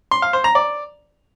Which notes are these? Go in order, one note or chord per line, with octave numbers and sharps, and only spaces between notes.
C6
F5
C5
A#5
D5